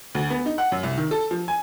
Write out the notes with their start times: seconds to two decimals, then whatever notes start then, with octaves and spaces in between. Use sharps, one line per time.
0.15 D2
0.30 B3
0.46 D#4
0.58 F#5
0.72 F#2
0.83 C2
0.98 D#3
1.11 A4
1.31 F3
1.48 G#5